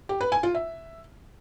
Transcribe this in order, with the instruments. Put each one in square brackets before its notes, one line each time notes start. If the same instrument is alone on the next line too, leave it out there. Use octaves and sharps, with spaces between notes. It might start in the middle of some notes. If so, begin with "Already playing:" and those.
[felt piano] G4
B4
G#5
F4
E5